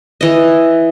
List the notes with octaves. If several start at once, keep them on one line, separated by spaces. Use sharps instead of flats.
E3 D#5